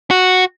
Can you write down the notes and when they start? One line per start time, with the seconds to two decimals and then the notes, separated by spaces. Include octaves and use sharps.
0.11 F#4